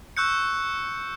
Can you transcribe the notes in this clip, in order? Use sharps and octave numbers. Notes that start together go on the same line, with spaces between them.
C#6 E6 F#6 G6 C#7